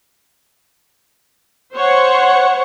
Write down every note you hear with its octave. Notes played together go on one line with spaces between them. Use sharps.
C5 C#5 F#5